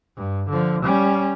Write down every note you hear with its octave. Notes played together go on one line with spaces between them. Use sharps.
G2
D3 F3
G3 C#4